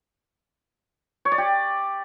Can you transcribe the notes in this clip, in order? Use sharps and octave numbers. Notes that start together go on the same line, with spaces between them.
C#5
D5
G4